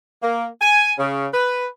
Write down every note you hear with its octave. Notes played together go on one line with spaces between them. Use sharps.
A#3
G#5
C#3
B4